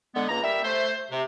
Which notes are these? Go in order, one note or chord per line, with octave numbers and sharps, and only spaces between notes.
D3 G#3 B3
C#2 A#3 A#5
G3 A#4 E5
A3 C5
C3